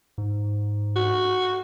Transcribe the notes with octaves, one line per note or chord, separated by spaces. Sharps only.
G#2
F#4